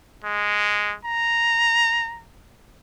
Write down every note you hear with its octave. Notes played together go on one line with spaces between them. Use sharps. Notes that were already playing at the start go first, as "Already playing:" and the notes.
G#3
A#5